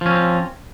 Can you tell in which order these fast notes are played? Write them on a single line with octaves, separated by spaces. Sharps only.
F3 C#4 C4